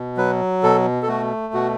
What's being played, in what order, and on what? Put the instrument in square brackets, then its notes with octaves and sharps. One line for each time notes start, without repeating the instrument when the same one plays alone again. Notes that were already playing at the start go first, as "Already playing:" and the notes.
Already playing: [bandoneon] B2
F#3 B4
B2 A4
A4
A3 F#4
B2 F#4